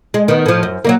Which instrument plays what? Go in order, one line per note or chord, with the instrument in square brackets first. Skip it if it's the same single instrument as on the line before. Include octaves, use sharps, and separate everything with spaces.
[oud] G#3
D#3 B3
A2 F3
F#2
F#3 G3 A#3